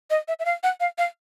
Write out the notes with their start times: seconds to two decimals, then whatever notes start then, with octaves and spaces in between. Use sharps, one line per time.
0.10 D#5
0.28 E5
0.39 E5
0.45 F5
0.63 F#5
0.80 F5
0.98 F5